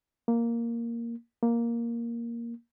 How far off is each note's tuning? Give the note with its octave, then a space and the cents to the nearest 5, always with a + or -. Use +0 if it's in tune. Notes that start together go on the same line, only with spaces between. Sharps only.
A#3 +0
A#3 +5